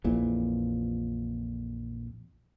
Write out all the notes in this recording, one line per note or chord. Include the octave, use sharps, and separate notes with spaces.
A#1 F2 A#2 E3